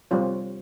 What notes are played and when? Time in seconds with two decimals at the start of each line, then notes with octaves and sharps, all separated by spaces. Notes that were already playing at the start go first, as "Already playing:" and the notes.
0.11 G3 C4 F4 C#5